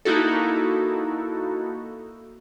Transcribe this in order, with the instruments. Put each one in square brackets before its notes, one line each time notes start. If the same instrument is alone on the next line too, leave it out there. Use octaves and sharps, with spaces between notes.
[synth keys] A#3 D#4 E4 F#4 A4